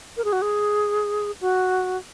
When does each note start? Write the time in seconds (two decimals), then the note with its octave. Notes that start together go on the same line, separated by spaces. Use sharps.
0.17 A#4
0.24 G#4
0.33 F#4
0.42 G#4
1.41 F#4